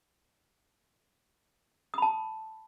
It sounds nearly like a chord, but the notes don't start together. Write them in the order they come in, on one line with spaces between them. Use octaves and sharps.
D#6 B5 A5